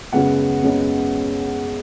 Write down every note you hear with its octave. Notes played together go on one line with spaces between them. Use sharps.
F#2 C#3 G#3 B3 F#5
F#2 C#3 G#3 B3